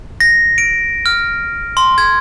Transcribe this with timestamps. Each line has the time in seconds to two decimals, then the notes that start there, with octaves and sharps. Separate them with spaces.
0.20 A#6
0.58 D7
1.06 F6
1.77 C6
1.98 G#6